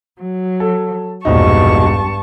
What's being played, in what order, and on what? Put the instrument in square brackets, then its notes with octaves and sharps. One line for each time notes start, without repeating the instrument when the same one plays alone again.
[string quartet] F#3
[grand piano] A4
[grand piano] E1 A#1 D#4 [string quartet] G2 A5 C#6